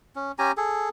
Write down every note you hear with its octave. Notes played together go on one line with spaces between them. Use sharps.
C#4
C#4 G4 G#5 A#5
G#4 A4